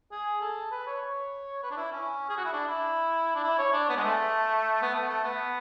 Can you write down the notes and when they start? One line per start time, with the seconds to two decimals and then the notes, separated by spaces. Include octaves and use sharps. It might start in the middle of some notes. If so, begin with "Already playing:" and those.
0.12 G#4
0.41 A4
0.72 B4
0.87 C#5
1.02 C#5
1.63 B4
1.71 D4
1.77 E4
1.92 C#4
2.29 G#4
2.37 F#4
2.45 E4
2.53 D4
2.68 E4
3.35 D4
3.43 E4
3.59 C#5
3.73 D4
3.89 B3
3.96 G#3
4.04 A3
4.82 B3
4.94 A3
5.09 A3
5.24 B3